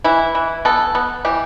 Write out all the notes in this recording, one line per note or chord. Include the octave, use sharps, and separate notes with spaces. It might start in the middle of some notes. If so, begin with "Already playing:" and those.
E3 E4
E3
B3 A4
B3
E3 G4